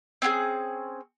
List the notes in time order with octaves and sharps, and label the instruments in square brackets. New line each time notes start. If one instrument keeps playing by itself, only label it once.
[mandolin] C4 C#4 G4 G#4